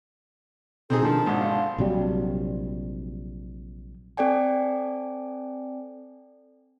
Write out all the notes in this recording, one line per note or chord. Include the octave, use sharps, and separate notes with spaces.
B2 C4 D#4 G#4 A4
D#3 F3 D4 A5
G#1 D3 C6
F5
A#1 C3 F#3 G3
C4 A4 D5 G5 G#5